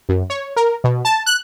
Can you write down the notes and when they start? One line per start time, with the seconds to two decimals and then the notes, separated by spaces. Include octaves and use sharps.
0.09 F#2
0.30 C#5
0.56 A#4
0.84 B2
1.05 A5
1.26 F#6